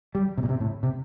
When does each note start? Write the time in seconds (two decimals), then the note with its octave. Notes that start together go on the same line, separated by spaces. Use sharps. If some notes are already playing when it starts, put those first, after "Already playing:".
0.15 G3
0.38 C3
0.43 A#2
0.49 C3
0.60 A2
0.83 C3